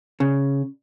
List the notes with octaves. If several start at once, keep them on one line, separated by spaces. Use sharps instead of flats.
C#3